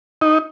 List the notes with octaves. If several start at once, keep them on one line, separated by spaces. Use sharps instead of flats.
D#4